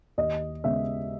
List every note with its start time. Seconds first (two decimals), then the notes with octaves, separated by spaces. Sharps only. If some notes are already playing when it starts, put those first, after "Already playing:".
0.18 D#2 D#5
0.64 C#3 G#3 B3 E5